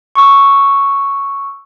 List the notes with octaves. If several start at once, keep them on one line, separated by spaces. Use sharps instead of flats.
C#6 E6